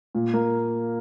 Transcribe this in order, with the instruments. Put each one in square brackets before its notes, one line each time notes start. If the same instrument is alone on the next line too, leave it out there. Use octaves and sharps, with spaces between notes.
[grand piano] A#2
A#3